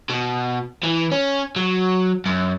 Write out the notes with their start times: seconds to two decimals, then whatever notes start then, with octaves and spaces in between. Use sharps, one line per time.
0.10 B2
0.83 E3
1.12 C#4
1.56 F#3
2.26 F#2